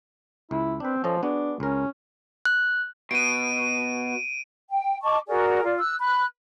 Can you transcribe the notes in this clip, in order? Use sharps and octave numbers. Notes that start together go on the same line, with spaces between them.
C#2 E4
C4 D4 B4
F3 C#4 A4 D#5
B3 D4 F#4 G#4
C#2 C#4 A#4
F#6
B2 D7 D#7
G5
D#5 A5 C#6 D6
F#4 G#4 A#4 D5
F4 D5
E6 F#6
B5 F#6